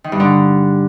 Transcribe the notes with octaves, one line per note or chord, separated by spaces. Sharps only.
D#3
G2
D3